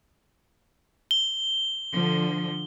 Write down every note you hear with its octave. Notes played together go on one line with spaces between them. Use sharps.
G7
D3 F3